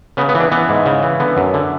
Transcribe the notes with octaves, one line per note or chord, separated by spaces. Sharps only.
C#3 B3
B3
E3
D4
E3 B3
G#2
C#3
E3
D3 B3
F#2
D3